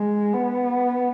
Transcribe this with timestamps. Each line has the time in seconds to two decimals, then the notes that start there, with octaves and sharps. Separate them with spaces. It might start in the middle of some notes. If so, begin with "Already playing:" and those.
Already playing: G#3
0.34 B3